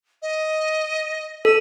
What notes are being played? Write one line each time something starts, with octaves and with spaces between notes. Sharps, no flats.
D#5
A4 E6